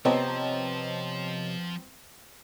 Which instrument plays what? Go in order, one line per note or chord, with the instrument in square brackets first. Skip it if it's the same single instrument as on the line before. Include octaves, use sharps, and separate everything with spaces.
[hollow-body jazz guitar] C3 [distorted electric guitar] F3 [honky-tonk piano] B3 C4 A#5 [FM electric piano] C#5 D#5 A5